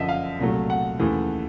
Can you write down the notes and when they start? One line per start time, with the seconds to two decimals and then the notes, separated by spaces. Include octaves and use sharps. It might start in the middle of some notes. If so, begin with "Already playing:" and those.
Already playing: F#1 F#2 D3 F3 D#5 E5
0.09 F5
0.39 C2 A#2 F#3 A3
0.70 F#5
0.99 D#2 C#3 E3 A3